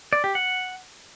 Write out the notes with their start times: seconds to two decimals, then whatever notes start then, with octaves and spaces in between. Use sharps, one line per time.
0.13 D5
0.24 G4
0.35 F#5